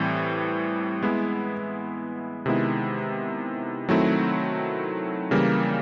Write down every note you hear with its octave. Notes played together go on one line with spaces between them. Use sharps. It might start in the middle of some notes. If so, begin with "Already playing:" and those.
Already playing: A2 E3 G3 C4
G#3 B3 E4
C3 D#3 G#3 B3 E4
D#3 F#3 A3 C4 E4
C#3 E3 G3 A#3